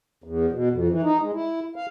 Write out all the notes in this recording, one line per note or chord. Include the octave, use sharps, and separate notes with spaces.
E2
B2
F2
E3
D#4
G#3
E4
F5